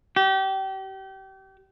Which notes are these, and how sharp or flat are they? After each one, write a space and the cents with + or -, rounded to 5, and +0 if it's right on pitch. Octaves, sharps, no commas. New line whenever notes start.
G4 -30